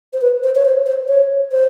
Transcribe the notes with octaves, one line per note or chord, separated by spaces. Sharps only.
C5
B4
C5
C#5
C5
C5
C#5
C5